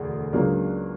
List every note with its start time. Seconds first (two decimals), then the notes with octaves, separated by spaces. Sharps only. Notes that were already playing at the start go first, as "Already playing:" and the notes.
Already playing: E1 D2 D3 G#4
0.33 C#2 C#3 F#3 A#3 D4